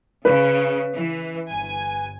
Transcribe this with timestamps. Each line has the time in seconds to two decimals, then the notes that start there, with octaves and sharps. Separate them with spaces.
0.25 C#3 B4
0.95 E3
1.49 G1 G#5